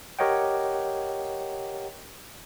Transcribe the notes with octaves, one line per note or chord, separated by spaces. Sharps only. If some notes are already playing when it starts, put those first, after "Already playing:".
G4 A#4 C#5 D#5 F#5 G5